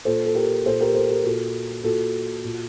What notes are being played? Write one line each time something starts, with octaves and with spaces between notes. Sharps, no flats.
A#2 A4 C5
A4
G4 A#4
A#2 A4 C5
G4 A#4
A4 C5
G4 A#4
A#2 F#4 A4
A#2 F#4 A4
A#2